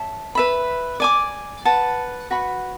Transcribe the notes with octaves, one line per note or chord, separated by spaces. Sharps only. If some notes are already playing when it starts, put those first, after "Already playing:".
Already playing: C#5 E5 A5
B4 E5 B5
D5 G#5 D6
B4 F#5 A5
F#4 B4 F#5 B5